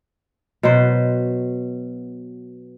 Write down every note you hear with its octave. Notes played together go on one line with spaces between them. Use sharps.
B2 F#3 B4 C5